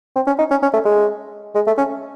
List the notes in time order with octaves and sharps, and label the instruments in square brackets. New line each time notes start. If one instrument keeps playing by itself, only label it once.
[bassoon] C4
C#4
D#4
C#4
C#4
A3
G#3
G#3
A3
C#4